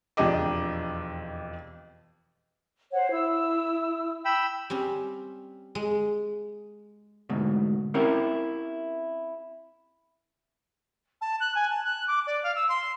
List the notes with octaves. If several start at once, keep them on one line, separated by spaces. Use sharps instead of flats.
E1 F2 D4 G4 D#5 D6
C5 C#5 F#5
E4 E6
G5 B5 E6
G3 C4 C#4
G#3
D2 G#2 B2
C4 C#4 E4 G4 A#4 C5
A5
F#6
G#5
A5
F#6
D6
D5
F5
E6
C6